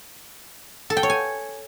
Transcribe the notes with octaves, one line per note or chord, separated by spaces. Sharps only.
A4
G5
C#5
G#5